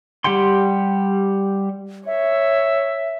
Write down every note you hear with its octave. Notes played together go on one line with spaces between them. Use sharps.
G3 G4 F#5 G5 C6
C#5 E5